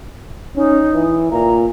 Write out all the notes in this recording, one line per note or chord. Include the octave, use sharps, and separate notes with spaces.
C#4 D#4
E3
A#2 A#5